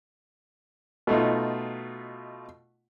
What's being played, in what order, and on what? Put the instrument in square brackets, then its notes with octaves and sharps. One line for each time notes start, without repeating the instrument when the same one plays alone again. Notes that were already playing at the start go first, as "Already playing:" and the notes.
[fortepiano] B2 A3 D#4 F4